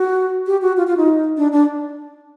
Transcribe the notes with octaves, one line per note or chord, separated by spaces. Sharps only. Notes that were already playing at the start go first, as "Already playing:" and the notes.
Already playing: F#4
G4
F#4
F4
F4
D#4
D4
D4